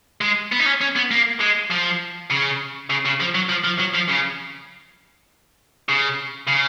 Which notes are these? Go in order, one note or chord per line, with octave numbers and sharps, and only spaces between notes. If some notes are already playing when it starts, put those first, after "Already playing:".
G#3
B3
D#4
C#4
C#4
B3
A#3
G#3
F3
C#3
C#3
C#3
F3
F#3
F3
F3
F#3
F3
C#3
C#3
C#3